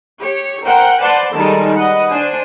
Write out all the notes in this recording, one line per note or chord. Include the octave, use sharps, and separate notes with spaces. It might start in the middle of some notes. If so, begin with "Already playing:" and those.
G4 C#5
A#4 C5 F#5 G5
B4 C5 D5 F#5 A5 C6
D#3 G3 G#3 A4 A#4 A5
B4 D#5 F#5
D4 C5 G#5